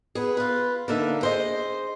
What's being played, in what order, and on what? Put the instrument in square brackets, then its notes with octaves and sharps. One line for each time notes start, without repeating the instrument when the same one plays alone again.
[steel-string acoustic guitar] B3 G#4
F4 B4
D3 A#3 D#4 E5
G#4 C5 D#5